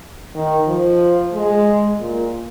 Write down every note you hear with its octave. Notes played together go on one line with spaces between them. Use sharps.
D#3
F3
G#3
A#2